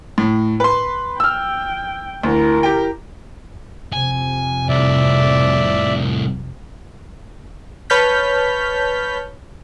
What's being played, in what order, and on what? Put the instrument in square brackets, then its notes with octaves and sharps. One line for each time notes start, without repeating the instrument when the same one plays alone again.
[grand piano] A2
B4 C6
[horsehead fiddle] G5 [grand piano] E6 F6
[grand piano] D2 [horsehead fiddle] E4 A#4
[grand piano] G4 G5
[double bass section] F2 C3 [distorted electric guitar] G#5
[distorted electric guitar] C2 A2 [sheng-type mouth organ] D5 E5
[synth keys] B4 C#5 A5 F6 G6 B6